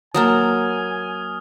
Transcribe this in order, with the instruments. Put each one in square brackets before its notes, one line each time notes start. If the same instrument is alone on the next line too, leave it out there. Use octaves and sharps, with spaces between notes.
[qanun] F#3 A#3 A5 [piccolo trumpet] G#5 [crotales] D#6 F6